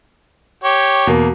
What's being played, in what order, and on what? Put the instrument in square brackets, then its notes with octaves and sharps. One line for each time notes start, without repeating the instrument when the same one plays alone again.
[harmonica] G4 C#5
[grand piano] E2 B2 A#3